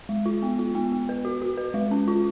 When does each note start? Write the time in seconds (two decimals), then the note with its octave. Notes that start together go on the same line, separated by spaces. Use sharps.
0.09 G#3
0.26 F4
0.42 B3
0.59 F4
0.75 B3
0.92 B3
1.09 B4
1.25 F#4
1.42 F#4
1.57 B4
1.74 G#3
1.91 C#4
2.08 F4